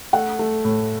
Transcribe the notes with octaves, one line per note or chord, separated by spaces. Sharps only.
A3 F#5
A3
A2